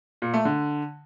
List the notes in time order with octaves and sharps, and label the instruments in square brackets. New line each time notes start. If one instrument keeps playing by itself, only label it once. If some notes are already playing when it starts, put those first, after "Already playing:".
[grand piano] A#2
A3
D3